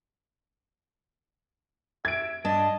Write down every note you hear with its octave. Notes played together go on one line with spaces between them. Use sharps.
E5 G#6 D7
G2 D4 D#5 A5